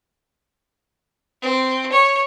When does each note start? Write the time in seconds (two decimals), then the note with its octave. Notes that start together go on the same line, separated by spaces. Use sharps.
1.42 C4
1.92 C#5